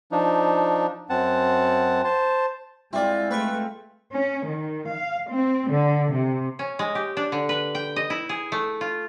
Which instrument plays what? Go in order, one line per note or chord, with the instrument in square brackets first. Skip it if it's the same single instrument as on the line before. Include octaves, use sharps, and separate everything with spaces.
[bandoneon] F3 D4 D#4
F#2 C4 F#5 A5
C5 A5
[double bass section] G#3 [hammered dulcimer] C4 F4 [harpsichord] E4 D5
[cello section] A3 [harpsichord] B4 B5 C#6
[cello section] C#4
D#3
F5
C4
D3
C3
[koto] C#4
G#3
G4
D4
D3
B4
G5
D#5
E4
G#4
A3
F4